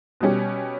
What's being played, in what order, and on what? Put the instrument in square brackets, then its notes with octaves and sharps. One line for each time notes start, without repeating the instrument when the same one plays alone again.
[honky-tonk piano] B2 G3 C#4 G4